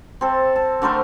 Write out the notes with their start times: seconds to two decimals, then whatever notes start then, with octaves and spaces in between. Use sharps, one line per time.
0.21 C4 A4
0.56 A5
0.82 D3 A3 A#4 C5